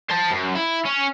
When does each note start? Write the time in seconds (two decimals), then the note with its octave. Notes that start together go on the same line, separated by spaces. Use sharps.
0.10 C5 A5
0.31 F#2
0.55 E4
0.85 C#4